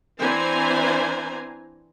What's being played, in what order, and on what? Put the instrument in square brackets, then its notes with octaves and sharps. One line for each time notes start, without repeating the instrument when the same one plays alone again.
[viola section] E3 C4 D4 C5 G#5 A#5